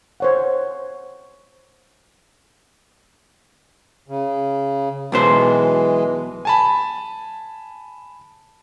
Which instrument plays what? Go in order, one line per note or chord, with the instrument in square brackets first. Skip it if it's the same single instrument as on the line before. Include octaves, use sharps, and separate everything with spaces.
[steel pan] C5 C#5 F#5
[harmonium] C#3
[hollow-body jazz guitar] B1 B2 C5 [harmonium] E3 G#3
[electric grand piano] G#5 A5 B5